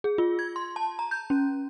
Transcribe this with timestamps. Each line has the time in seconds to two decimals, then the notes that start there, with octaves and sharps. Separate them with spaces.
0.04 G#4
0.18 F4
0.39 G#6
0.56 C6
0.76 A5
0.99 A#5
1.11 G6
1.30 C#4